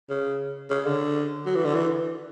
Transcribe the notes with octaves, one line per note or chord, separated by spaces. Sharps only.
C#3
C#3
D3
F#3
E3
D3
E3